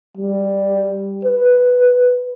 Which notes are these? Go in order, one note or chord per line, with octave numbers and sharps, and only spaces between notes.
G3
B4